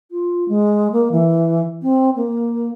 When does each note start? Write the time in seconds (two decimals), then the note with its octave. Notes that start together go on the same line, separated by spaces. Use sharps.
0.11 F4
0.48 G#3
0.92 A#3
1.12 E3
1.82 C4
2.16 A#3